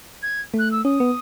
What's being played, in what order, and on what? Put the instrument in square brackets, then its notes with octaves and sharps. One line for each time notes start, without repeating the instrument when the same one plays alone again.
[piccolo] G#6
[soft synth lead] A3
[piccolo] F#6
E6
[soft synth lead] C#4 [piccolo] D#6
[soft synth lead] B3